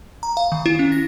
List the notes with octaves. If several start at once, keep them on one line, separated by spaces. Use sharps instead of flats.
A#5
F5
D#3
E4
C#4
A#6